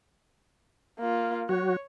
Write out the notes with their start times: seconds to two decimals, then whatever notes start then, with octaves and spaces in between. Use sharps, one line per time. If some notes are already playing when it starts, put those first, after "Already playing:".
0.99 A#3 F4
1.49 F#3 F#4 C#5